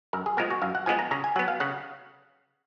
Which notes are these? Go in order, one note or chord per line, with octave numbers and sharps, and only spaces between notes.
F#2 A#4
G#4
F3 G#3 B3 A#4
F#4
F#2 F5
F#5
F3 G#3 B3 G#5
A#5
C#3 A#5
G#5
F#3 B3 F#5
F5
C#3 F#5